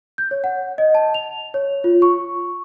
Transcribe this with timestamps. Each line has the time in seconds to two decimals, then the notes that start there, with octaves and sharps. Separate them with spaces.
0.18 G6
0.31 C#5
0.44 F#5
0.78 D#5
0.95 A5
1.14 F7
1.54 C#5
1.84 F4
2.02 C#6